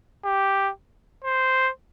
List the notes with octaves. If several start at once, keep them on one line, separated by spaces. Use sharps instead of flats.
G4
C5